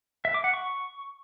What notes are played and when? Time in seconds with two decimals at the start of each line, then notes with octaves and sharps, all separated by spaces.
0.25 E5
0.34 D6
0.44 F#5
0.54 C#6